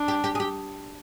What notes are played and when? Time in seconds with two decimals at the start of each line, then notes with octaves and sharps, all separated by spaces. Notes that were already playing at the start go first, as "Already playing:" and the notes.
Already playing: D4
0.08 G4
0.24 G4
0.35 G#4
0.40 G4